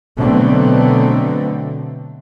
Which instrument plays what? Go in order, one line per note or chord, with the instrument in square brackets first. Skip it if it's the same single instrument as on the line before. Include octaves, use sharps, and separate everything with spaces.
[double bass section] B2 D3 F#3 A3 B3 C4